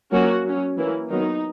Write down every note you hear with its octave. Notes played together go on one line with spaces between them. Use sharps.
F#3 A#3 C#4 F#4
F#3 C#4
E3 A#3 C#4 E4
D#3 F#3 B3 D#4